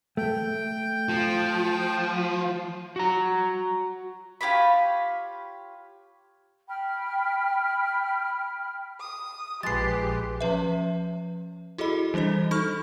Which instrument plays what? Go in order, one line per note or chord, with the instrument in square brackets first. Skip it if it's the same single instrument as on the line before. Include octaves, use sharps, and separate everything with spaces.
[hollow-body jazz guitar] A3 [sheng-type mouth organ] G5
[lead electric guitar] F3
[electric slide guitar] F#4 A#5
[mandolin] F4 G4 C#5 B5
[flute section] G5 B5 F6
[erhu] D#6
[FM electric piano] A#1 F3 [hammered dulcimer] G#3 B4 [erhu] G4 [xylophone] A6 C7
[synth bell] F3 C#4 B4 E5
E4 F#4 G#4 A4 D#5 B5
E3 G3 D4 C5 D#5
D#4 A4 C#6 F6